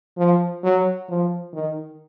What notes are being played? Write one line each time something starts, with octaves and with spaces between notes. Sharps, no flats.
F3
F#3
F3
D#3